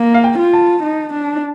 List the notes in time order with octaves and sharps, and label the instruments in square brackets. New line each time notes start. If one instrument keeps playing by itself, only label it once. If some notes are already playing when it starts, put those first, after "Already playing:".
Already playing: [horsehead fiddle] A#3
[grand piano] F5
G5
[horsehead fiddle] F4
[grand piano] A5
[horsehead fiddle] D#4
D4